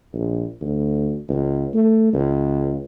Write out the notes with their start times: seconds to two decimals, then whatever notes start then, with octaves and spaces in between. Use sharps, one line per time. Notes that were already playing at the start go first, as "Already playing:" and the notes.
0.13 A#1
0.61 D2
1.28 C#2
1.74 A3
2.13 C#2